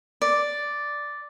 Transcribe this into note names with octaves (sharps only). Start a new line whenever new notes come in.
D5